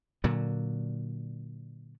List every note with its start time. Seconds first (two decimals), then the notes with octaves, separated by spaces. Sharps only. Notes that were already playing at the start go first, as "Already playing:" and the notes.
0.24 A#2 D3 F#3